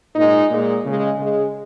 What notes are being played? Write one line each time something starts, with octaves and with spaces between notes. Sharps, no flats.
A#2 G#3 D#4
A#2 G#3
C#3 G#3
C#3 G#3